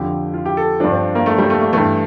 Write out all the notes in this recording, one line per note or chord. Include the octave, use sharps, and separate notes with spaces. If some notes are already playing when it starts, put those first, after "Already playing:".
Already playing: F2 D3 F3 G4
F4
G4
A4
G2 F3 D4
C4
A#3
A3
G3
A3
A3
G2 E3 A3